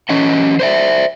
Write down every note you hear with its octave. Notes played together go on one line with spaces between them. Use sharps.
E3 C#4 D#5 F#5
C5 D5 E5